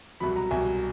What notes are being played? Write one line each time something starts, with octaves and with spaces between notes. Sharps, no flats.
C2 B2 F#3 B5
A#5
C2 B2 F#3 G#5